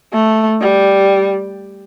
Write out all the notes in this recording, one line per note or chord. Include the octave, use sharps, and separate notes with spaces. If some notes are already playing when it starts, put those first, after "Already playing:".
A3
G3